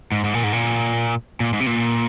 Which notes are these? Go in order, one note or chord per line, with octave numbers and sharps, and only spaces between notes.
G#2
G#2
A#2
G#2
A#2
A#2
G#2
C3
A#2